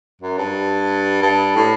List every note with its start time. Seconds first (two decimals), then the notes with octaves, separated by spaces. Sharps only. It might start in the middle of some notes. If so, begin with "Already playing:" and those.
0.21 F#2
0.38 G2
1.22 G2
1.56 A2